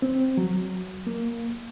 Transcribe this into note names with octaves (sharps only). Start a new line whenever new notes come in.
C4
F#3
A#3